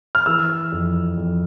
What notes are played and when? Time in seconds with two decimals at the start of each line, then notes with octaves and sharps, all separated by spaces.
0.15 F6
0.26 E3 E6
0.72 F2
1.18 F2